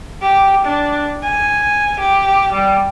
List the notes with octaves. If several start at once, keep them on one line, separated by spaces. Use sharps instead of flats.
G4
D4
G#5
G4
G3